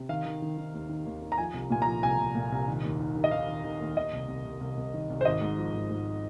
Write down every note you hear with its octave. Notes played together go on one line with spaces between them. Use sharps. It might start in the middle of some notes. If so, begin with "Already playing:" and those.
Already playing: C3
D#3 F5
D#3
D#3
D#3
D#2
D#3
D#2
D#3
A#5
F3 G#5
C2
A#2 G#5
A#5
F3
C2 G#5
C2
A#2
C2
D#3
D#2
D#3
D#3
D#5
D#3 F5
D#3
D#3
D#2
D#3 D#5
C2
C2
C2
C2
C2
D#3
C2
C5
G#1 D#5
G#2
F3
G#1
G#2